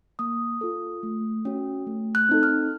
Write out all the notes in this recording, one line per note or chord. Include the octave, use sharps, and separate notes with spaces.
A#3 D#6
F4 A4
A3
C#4 F#4
A3
F#6
C4 D#4 A4
F6